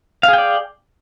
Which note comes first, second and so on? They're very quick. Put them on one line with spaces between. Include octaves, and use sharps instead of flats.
F5 G#4 G5 D5